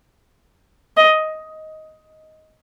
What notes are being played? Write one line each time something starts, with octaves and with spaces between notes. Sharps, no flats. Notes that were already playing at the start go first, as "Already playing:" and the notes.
D#5